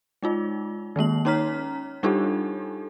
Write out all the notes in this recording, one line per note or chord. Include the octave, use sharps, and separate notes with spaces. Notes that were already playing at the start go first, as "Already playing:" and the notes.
G#3 D#4 F4
D#3 G#3 A#3 F#7
C#4 D#4 C#5 A#5 F6 B6
G3 D4 D#4 F4 G4 A4